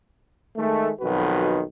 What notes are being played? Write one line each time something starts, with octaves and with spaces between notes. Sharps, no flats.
D#3 G#3 A3
B1 F2 D#3 F#4 B4